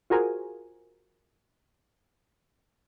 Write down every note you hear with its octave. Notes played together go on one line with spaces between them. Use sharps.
F4 F#4 G#4 A#4 C5 G#5